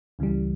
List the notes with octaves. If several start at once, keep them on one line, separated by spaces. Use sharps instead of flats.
C#2 C#3 E3 G3